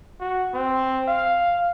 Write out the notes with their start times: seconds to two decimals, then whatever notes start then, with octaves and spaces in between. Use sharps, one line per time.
0.20 F#4
0.54 C4
1.08 F5